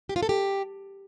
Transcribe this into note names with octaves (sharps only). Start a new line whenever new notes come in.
G4
F4
A4
G4